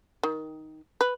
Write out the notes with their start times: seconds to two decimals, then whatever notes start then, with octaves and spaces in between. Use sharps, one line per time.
0.23 D#3
1.01 B4